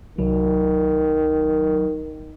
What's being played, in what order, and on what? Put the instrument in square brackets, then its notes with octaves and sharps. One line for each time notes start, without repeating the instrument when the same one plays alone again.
[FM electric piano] C2 F#3 [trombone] D#3